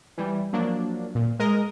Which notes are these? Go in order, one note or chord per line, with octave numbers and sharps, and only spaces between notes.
E3 G3
F3 F#3 A#3 D4
A#2
G#3 A#4 D#5